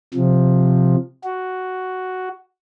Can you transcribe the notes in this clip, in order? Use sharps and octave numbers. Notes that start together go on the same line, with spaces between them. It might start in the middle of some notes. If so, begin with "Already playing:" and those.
C3 F3
F#4